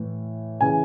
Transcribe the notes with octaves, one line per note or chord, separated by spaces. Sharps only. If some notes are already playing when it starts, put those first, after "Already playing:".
Already playing: A2 E3
C#3 E3 G#5